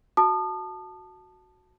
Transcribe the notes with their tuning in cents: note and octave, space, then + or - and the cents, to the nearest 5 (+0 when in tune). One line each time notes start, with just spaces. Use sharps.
F#4 -5 A5 +0 D#6 -35